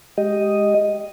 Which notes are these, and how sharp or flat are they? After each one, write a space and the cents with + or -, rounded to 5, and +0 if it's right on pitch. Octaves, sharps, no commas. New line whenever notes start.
G#3 +0 G4 +0 D#5 +0